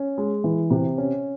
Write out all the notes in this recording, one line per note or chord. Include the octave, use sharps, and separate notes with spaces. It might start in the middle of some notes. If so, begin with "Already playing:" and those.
Already playing: C#4
G#3
E3
C3
C#4